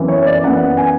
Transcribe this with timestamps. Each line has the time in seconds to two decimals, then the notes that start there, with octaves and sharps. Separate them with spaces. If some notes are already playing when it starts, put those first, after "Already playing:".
Already playing: F#2 E3 B3
0.08 C#5
0.26 D5
0.43 F#2 E3 B3 F#5
0.77 G#5